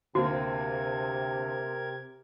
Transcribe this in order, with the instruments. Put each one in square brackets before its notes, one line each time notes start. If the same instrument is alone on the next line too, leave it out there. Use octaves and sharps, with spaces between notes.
[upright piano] D2 A#3 C4 [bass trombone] C3 [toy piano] F#4 [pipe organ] G4 A#4 G#6